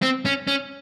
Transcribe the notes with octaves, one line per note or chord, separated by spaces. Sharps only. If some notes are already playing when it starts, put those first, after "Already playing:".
C4
C#4
C#4